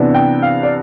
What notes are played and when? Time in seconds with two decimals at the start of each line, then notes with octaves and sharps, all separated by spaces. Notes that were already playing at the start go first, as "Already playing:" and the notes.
Already playing: C3 E3 B3 D4
0.14 G5
0.42 F5
0.63 D5